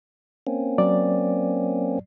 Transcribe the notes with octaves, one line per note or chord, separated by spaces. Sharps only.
A#3 C4 C#4
F#3 D5